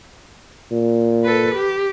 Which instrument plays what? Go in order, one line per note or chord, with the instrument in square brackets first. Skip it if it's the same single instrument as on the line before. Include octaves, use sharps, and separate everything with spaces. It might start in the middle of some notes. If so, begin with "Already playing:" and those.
[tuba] A#2
[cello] A4 B4
G4